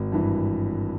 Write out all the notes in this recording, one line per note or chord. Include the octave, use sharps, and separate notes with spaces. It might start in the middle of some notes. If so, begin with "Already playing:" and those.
Already playing: G#1
G2 E3